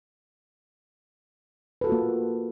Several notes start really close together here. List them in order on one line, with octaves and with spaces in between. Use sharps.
B4 A4 F#4 F4 A#3